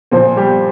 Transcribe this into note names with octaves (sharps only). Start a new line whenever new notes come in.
A#2 F3 C4 C5
G3 G4